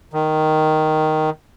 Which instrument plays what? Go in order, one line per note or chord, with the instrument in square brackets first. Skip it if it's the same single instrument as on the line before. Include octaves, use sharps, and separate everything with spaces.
[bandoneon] D#3